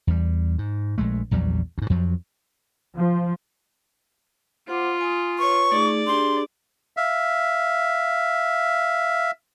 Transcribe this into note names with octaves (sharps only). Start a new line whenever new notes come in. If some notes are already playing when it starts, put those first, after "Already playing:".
E2 G3
G#2
A#1 G#3 A3
A#1 E2 F#3 G3
D2 G#2
F2 F3 F#3
F3
F4 C5 F#5 D6
G#5 D#6
B4 C#5 C#6
A3 D#4 G#4 D5
D4 G4 G#4 C6
E5 F5